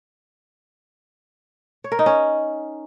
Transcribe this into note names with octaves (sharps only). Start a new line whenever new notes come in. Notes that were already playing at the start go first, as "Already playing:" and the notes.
C#5
A#4
D#4
C#4